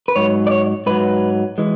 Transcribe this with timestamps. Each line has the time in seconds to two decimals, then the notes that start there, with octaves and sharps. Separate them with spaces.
0.08 B4
0.16 G#2 F#3 C#5
0.47 D5
0.51 C#5
0.86 G#2 F#3 B4
1.58 E3 G#3